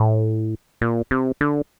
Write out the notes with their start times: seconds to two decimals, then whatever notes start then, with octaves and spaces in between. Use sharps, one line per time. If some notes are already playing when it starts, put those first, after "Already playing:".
Already playing: A2
0.81 A#2
1.11 C3
1.41 D3